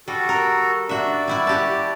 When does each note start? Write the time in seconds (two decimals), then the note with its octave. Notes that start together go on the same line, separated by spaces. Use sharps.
0.08 G3 F#4 A4
0.29 A#4
0.89 D4 F#4 E5
1.12 D5
1.28 G3 E4 F#4
1.47 F#4 G4 A5